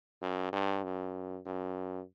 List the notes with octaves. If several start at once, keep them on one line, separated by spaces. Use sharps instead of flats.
F#2
G2
F#2
F#2